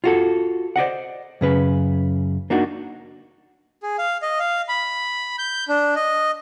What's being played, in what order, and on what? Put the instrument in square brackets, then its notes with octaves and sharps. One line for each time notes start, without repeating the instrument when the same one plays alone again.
[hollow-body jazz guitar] F4 F#4 A4
C5 D5 D#5 F#5
F#2 C#3 B4
A#3 D4 D#4 F#4
[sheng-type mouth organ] G#4
F5
D#5
F5
B5
G6
D4
D#5